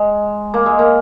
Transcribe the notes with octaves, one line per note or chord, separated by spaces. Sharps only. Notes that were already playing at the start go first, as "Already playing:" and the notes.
Already playing: G#3
A#3
G#3
A#3